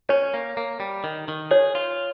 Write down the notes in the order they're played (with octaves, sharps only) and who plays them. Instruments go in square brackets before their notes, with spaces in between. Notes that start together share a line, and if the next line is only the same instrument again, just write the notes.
[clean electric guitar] C#4 [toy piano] C#5
[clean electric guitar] A#3
A#3
G3
D#3
D#3
[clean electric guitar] G#4 [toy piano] C#5
[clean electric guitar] F4